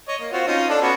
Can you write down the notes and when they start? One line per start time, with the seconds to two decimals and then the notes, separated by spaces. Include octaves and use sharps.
0.08 C#5 D#5
0.21 A#3
0.33 C4 F4 F#4
0.47 C#4 D#4 F4
0.69 D4 A4
0.82 B3 C#4 F#4